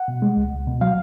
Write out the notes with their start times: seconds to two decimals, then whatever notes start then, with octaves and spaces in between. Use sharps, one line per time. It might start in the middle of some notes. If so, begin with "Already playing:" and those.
Already playing: F#5
0.08 B2
0.22 G#3
0.37 C#2
0.52 C#2
0.67 B2
0.81 F#3 F5